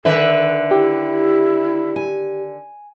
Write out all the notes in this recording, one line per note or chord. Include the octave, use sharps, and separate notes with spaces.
D3 D#3 A4 B4 E5
E4 G4
G#5